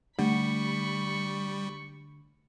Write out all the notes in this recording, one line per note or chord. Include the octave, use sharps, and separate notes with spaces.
D3 G3 A3 D4 B5 C#6